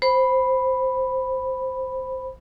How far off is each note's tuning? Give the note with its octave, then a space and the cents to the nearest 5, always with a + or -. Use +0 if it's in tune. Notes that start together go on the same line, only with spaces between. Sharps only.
C5 +0 B5 +0